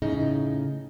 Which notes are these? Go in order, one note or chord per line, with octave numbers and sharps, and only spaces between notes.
A2 C#3 D#4